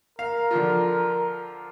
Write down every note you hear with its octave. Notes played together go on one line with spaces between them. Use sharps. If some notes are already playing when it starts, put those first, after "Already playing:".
A#4 F5
D3 F3 F4